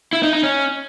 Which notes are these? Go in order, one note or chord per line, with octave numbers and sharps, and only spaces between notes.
E4
D#4
D#4
C#4